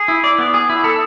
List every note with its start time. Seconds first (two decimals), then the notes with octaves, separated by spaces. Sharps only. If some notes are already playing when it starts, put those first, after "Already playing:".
Already playing: G#4
0.08 E4
0.24 D5
0.38 B3
0.54 G#4
0.70 E4
0.84 A4